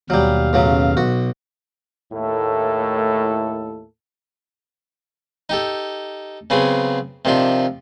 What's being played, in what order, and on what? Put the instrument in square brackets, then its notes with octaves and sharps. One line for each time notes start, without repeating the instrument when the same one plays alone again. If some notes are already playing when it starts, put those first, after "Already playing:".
[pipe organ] D#2 B2 F5 [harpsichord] F#3 G3
[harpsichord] A1 C#3 F#3
B1 F#4
[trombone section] D#2 A2 A3 A#3 E4 A4
[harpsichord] D#4 G4 A4
C#3 F#3 B3 C4 G#4
C3 D#3 F3 D4 F4